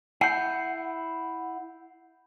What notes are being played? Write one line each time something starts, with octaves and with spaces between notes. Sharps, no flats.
E4 F#5 G6 C7